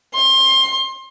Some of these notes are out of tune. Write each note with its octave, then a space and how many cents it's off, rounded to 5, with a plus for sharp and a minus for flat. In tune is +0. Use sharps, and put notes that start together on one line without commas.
C6 +25